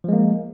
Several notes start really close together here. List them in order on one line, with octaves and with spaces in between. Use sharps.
F3 G#3 A#3